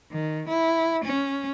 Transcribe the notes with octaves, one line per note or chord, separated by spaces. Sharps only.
D#3
E4
C#4